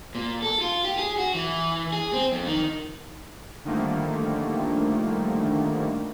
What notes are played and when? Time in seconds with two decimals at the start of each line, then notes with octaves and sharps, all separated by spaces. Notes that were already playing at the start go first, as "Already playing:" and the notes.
0.15 A#2
0.42 A4
0.61 F4
0.85 G4
0.98 G#4
1.18 F#4
1.34 E3
1.93 G#4
2.13 C4
2.32 F2
2.47 D#3
3.65 D3 D#3 F3 G3 A3 A#3